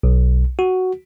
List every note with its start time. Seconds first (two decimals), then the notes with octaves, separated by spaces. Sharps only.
0.03 B1
0.59 F#4